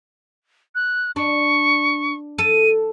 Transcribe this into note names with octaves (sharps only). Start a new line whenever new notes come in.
F#6
D4 C#6
A4 D#7